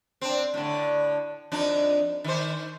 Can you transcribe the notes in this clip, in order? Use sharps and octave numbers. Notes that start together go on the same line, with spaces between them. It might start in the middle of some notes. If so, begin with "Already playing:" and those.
C4 D4
A2 D3
F2 D4 D#4
D#3 C5